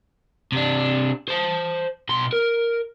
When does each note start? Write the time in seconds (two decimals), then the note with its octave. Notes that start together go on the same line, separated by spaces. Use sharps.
0.52 C3 D4
1.28 C5 A5
2.09 B2 C6
2.33 A#4